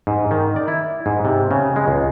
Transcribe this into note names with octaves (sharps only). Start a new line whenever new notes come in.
G#2
D#3
D5
E4
G#2
C3
C#3
G#3
C#2